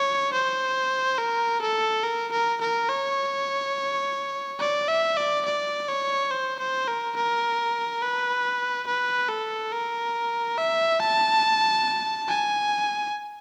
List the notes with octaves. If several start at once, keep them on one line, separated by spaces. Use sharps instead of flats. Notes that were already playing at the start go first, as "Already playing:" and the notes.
Already playing: C#5
C5
A#4
A4
A#4
A#4
A#4
C#5
D5
E5
D5
D5
C#5
C5
C5
A#4
A#4
B4
B4
A4
A#4
E5
A5
G#5